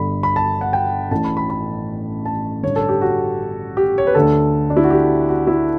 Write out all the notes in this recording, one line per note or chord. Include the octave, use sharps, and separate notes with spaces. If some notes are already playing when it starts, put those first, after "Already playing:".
Already playing: G1 G2 D3 B5
B5
A5
F#5
G5
A1 A2 E3 A5
B5
B5
B5
A5
A1 G2 D3 C#5
A4
G4
F#4
G4
C#5
B4
D2 D3 A4
D4
E4
F#4
G4
F#4
E4